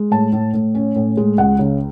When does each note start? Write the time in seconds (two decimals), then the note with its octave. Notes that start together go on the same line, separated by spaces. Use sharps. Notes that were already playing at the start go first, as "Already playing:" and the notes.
Already playing: G#3
0.11 A2 A5
0.32 A2
0.54 A2
0.75 C#4
0.96 A2
1.17 G#3
1.38 C#2 F#5
1.59 C#3